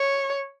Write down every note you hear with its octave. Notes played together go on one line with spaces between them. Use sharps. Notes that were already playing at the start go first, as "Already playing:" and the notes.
Already playing: C#5